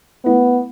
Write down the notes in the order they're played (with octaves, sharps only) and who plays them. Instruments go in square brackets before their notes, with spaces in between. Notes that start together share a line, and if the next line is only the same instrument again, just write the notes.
[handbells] A3 E4 B4 [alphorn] B3